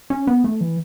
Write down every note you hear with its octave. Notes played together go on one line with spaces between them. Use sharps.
C#4
B3
A3
E3